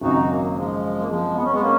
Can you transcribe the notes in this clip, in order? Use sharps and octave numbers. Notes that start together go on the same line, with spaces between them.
G#1 F#2 C#3 D#4 F#4
F#3 A#3
F3 G#3
A#3
F3 G#3
B3
C#4
G#3 B3
A#3 C#4